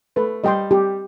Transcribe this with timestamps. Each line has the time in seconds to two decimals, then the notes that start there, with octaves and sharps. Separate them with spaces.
0.16 A3 B4
0.44 G3 D#5 G5 C6
0.71 G3 G4